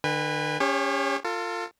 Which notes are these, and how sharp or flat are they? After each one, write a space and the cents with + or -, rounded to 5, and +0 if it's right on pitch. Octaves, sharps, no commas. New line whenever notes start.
D3 +45 B4 +0 G#5 -40
C#4 +20 G4 +40 C#5 -30
F4 +5 A4 +35